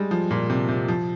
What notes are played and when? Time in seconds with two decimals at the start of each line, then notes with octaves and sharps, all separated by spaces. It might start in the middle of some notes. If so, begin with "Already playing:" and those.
Already playing: G3 G#3
0.11 F3
0.31 A#2
0.50 C3
0.69 C3
0.88 F3